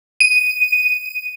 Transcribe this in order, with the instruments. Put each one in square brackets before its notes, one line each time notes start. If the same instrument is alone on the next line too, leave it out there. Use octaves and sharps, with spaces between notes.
[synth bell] D#7